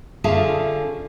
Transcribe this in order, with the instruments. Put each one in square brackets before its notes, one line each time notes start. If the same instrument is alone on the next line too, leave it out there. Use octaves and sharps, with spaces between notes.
[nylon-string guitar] D3 C#4 F4 G#4 E5 A5